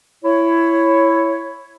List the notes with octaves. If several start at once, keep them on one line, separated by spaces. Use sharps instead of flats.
E4 C#5